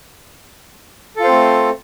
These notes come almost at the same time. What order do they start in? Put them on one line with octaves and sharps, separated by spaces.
A4 F4 C5 C4 A3